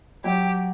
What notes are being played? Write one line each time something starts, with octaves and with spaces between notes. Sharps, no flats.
F#3 G4